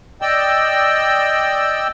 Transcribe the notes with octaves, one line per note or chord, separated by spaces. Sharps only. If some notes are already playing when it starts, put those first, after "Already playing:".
D5 D#5 G5 E6